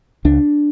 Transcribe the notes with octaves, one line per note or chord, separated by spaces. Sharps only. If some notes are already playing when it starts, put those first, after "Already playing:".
C#2 D4